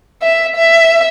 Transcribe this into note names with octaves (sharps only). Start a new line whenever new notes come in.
E5
E5